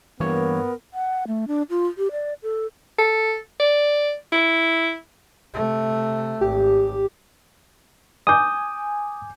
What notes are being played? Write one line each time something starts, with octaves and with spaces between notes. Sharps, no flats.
G2 E3 A#3 B3 A#4 C#5
F#5
A3
D4
F4
G4
D5
A4
A4
D5
E4
C3 A3
G#1 G4
G#5 D6 D#6 G6